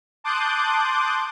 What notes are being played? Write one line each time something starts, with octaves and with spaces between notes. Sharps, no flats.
A5 C6 D6 D#6 F#6 G6